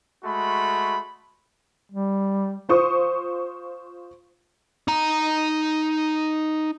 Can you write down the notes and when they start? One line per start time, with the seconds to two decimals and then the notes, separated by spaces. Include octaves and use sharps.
0.24 G#3 A3 F#4 B5
1.92 G3
2.69 F4 C5 C#6 D#6
4.88 D#4 A#5